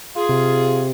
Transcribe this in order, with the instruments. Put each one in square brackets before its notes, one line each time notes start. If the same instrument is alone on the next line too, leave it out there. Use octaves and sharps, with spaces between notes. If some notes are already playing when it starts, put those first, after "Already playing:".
[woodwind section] F4 G#4
[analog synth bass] C3